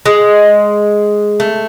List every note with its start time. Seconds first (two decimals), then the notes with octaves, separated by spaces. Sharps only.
0.06 G#3
1.40 A3